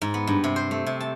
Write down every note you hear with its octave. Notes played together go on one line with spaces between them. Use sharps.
G#2
B3
G2
C3
C5
A3
C3
A5